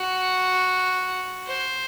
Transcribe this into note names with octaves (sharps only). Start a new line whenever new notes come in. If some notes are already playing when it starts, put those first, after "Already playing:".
Already playing: F#4
C5